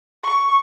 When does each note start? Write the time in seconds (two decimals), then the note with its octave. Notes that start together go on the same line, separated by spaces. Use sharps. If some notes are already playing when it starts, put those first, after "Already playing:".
0.24 C#6